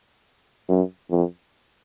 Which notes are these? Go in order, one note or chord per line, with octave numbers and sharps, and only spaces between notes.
F#2
F2